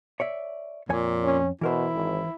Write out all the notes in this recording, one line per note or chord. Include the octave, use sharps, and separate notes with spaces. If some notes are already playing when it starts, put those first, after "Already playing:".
C#5 D5 E5
F2 A#2 C#5 G#5
C#4
B2 E3 E4 A#4 C5
G#1